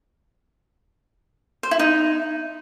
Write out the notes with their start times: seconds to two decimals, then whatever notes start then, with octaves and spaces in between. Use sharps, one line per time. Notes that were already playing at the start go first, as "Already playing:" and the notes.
1.63 C5
1.71 E4
1.79 D#4